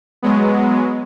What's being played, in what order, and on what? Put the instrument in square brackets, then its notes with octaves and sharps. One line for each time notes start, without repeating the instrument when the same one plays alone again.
[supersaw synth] F#3 G#3 B3